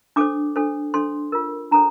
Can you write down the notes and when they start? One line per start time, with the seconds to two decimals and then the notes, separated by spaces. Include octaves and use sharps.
0.16 D4 A4 C5 D6
0.56 D4 A4 C5
0.94 D4 A4 C5 C6
1.32 F4 A#4
1.71 D4 A4 C5 A#5